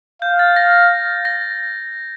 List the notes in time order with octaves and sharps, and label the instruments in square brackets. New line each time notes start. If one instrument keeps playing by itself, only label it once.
[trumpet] F5 [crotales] G6
[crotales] A6
A#6
A#6